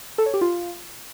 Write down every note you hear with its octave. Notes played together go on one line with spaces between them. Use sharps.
A4
C#5
G4
F4